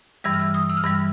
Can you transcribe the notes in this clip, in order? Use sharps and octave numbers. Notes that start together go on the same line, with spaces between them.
G2 E3 G3 E6
F6
E6
D#6
E6
F6
G2 E3 G3 E6